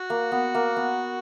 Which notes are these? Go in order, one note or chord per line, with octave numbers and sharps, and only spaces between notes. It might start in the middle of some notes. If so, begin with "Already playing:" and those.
Already playing: F#4
A#3
B3
A#3
B3